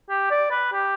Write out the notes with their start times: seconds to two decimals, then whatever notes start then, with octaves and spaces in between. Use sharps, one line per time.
0.10 G4
0.31 D5
0.51 B4
0.73 G4